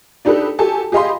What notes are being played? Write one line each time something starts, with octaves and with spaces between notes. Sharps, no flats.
D4 D#4 G4 A4 B4
F#4 G4 A4 G#5 A5
G4 G#4 D#5 F5 B5 C6